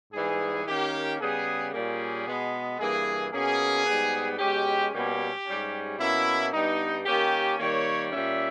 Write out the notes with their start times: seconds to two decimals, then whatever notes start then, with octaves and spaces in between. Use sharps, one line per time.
0.13 G#2 E3 G3 B3 G#4
0.66 D#3 A#3 C#4 G4
1.19 C#3 G3 B3 G#4
1.73 A#2 G3 A#3 C#4 G#4
2.26 B2 G#3 B3
2.79 G2 E3 A#3 G#4
3.32 B2 A#3 C#4 G#4
3.86 G#2 G3 B3
4.39 B2 G#3 C#4 G4
4.92 B2 G3 A#3 C#4 G4
5.45 G#2 G3 C#4
5.98 B2 A#3 C#4 E4
6.52 G2 G3 B3 D#4
7.06 D#3 A#3 C#4 G4
7.59 D#3 G3 A#3 C#5
8.11 A#2 G3 C#4 E5